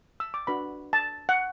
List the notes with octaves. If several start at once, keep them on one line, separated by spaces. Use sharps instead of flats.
E6
D6
D4 F#4 B4 B5
A5
F#5